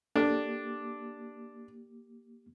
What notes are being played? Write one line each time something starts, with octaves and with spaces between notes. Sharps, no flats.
A#3 D4 G4 A4 D5 D6